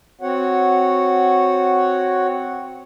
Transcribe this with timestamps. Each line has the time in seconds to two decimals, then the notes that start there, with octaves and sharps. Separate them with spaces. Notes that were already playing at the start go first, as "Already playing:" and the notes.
0.21 C4 F#4 C#5 F#5